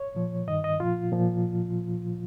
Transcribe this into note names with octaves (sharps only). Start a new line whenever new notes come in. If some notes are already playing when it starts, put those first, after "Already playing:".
Already playing: C#5
A#2 F3
G2 D#3 D#5
D#5
A#2 F3 F4
A#2 F3